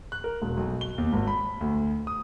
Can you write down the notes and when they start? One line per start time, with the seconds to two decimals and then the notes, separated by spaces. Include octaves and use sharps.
0.12 F#6
0.24 A#4
0.42 E1
0.57 B1
0.81 G7
0.98 D#2
1.13 G#1
1.28 B5
1.61 D2
2.07 D#6